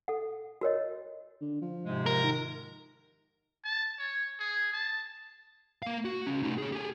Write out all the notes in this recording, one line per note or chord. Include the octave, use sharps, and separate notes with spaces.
A4 F#5
F#4 A#4 C#5 D#5
D3
F3
G#2 C3 G#3
A#4
D#3
A5
C#5
G#4
A5
A#3 F5
F#4
C#2 C#4
A3 D#4
G#4 C#5
G4 G#4